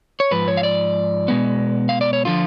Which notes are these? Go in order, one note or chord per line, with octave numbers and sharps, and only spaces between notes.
C#5
G#2 F3 B4
C#5
F5
D5
B2 G#3 B3
F5
D5
C#5
D3 F3 F4